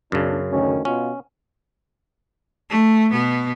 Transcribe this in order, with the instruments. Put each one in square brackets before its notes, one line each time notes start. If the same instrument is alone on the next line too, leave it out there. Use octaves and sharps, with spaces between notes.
[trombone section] B1 D4 [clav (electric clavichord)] F#2 C#3
[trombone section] D2 D#3 C#4
[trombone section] B2 F4 [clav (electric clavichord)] C#4
[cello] A3
B2 B3